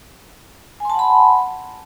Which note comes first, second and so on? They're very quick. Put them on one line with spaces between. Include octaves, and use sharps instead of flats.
G#5 C6 A5 F#5 B5